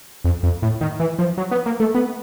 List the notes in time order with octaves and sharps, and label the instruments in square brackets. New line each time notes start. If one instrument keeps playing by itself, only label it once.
[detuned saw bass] F2
F2
A2
D#3
E3
F3
F#3
B3
A#3
A3
B3